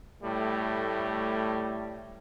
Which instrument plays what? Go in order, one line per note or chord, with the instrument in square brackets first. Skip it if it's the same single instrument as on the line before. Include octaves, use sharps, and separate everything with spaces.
[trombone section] A2 G3 A3